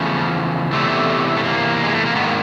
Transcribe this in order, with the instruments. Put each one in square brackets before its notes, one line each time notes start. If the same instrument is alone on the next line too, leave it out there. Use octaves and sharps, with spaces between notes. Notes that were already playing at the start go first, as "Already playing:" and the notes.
Already playing: [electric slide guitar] E2 C#3 F3 A3
E2 C3 E3 A3
A3
A#3
G#3
A3
A#3
G#2 D#3 B3
A#3